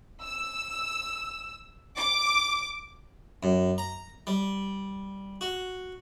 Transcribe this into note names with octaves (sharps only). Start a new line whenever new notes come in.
E6
D6
F#2
A#5
G3
F#4